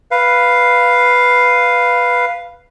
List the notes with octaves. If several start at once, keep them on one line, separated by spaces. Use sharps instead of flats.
B4 F5